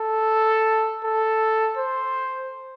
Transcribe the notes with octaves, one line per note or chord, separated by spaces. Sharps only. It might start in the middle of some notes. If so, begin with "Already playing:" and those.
Already playing: A4
A4
C5